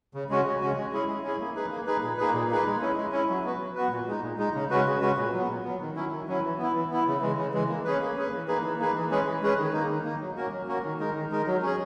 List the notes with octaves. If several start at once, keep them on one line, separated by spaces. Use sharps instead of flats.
C#3
G#3 C#4 F#4
C#3
G#3 C#4 F#4
G#3
C#4 E4 G#4
G#3
C#4 E4 G#4
A#3
D#4 G#4 B4
A#3
D#4 G#4 B4
A#2
A#3 D#4 G#4 B4
A#2
A#3 D#4 G#4 B4
G#3
C#4 E4
G#3
C#4 E4
F#3
B3 F#4 B4
F#3
B3 F#4 B4
A#2
G#3 D#4
A#2
G#3 D#4
C#3
G#3 C#4 F#4 B4
C#3
G#3 C#4 F#4 B4
A#2
F#3 B3
A#2
F#3 B3
D#3
F#3 C#4 E4
D#3
F#3 C#4 E4
E3
B3 E4
E3
B3 E4
C#3
E3 G#3
C#3
E3 G#3
A#3
C#4 G#4 B4
A#3
C#4 G#4 B4
E3
A#3 D#4 G#4 B4
E3
A#3 D#4 G#4 B4
E3
G#3 C#4 G#4 B4
E3
G#3 C#4 G#4 B4
D#3
A#3 D#4
D#3
A#3 D#4
F#3
A#3 C#4 F#4 A#4
F#3
A#3 C#4 F#4 A#4
D#3
G#3 D#4 A#4
D#3
G#3 D#4 A#4
F#3
C#4 G#4